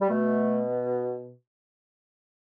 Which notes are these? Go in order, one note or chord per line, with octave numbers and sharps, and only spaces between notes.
G3
B2 A3